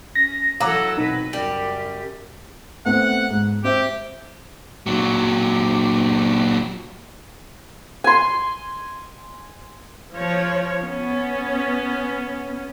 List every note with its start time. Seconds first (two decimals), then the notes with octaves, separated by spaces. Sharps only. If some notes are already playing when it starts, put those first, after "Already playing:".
0.15 C#4 A#6
0.60 E3 F#3 A4 F5 A#5 D6
0.98 B2 C4 D#4 B4
1.33 F#2 C#3 G3 G4
2.85 A3 B3 C4 F#5
3.30 G#2
3.64 C4 G4 C5 E5
4.86 A#2 F#3
8.04 G#5 C6
10.15 F3 C#5
10.82 B3 C#4